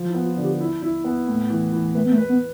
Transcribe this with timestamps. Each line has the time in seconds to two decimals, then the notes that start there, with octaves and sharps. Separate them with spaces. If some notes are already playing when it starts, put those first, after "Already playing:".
Already playing: F3
0.09 E4
0.14 B3
0.26 F4
0.37 D3
0.43 G4
0.61 E4
0.82 E4
1.04 B3
1.28 A2
1.49 E3
1.72 E3
1.94 A3 B4
2.06 B3
2.12 A3
2.18 B4
2.29 B3